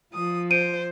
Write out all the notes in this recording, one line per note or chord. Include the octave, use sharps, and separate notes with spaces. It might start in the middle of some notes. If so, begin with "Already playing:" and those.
F3 D#6
C5 D7 D#7